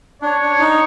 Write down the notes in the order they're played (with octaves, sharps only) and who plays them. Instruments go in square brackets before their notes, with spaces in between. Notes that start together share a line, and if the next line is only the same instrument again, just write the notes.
[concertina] D4 [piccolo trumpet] C#5
[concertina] D4
D#4